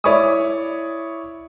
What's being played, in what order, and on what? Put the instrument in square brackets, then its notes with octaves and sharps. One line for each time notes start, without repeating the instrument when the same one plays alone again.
[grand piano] E4 C#5 D5 B5 C#6 D#6